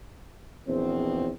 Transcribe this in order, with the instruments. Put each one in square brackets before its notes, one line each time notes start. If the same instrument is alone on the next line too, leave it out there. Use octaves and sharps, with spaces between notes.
[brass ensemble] A#1 E2 B2 F3 C4